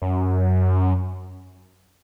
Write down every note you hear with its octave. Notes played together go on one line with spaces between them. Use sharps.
F#2